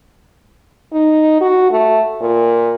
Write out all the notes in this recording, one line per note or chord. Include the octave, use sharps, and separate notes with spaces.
D#4
F#4
A3
A#2